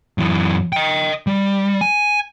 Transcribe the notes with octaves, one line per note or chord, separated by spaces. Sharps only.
F#2 E3
D#5 G5
G3
G#5